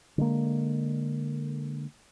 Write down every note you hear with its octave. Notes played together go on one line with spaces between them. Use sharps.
D3 G#3 A#3